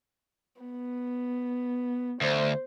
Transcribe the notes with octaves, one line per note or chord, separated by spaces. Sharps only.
B3
D2 C5